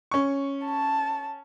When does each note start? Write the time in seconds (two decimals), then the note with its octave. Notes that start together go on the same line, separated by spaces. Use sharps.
0.11 C#4 C#6
0.65 A5